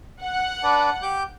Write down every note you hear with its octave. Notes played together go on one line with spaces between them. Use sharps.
F#5
D4 B4 D5
G4 D6 G6